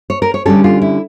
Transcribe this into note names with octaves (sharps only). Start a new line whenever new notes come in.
C#5
A#4
C#5
D3 G3 C#4 A4
F4
E4